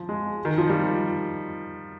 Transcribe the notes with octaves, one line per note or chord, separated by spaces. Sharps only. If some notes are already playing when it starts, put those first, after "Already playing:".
Already playing: F3
G#3
D#3
F3
G3